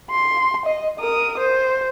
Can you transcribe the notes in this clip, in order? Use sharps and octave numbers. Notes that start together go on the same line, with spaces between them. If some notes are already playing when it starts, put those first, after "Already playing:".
C6
D#5
A#4 D#6
C5